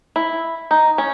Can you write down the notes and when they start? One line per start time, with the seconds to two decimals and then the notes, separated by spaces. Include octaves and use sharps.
0.16 E4
0.71 D#4
0.98 C#4